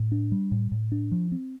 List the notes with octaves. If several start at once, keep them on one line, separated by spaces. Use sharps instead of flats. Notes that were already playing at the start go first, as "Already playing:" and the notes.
Already playing: A2
D4
G3
A2
A2
D4
F3
C4